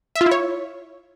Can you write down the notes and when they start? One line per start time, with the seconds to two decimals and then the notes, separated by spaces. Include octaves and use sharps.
0.16 E5
0.21 F4
0.26 E4
0.31 C#5